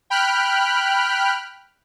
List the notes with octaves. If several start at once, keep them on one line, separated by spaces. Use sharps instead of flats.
G5 B5 F6 F#6